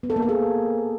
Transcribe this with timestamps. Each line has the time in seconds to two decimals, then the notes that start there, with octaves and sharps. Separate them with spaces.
0.03 B3
0.10 A4
0.16 A#3
0.22 A4
0.29 G#4